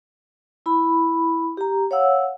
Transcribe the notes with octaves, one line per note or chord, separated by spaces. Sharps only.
E4 B5
G4 A#5
C#5 F5 F#5 E6